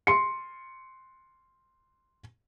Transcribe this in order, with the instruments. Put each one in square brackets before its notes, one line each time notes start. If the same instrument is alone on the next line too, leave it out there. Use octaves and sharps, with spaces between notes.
[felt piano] C6 C#7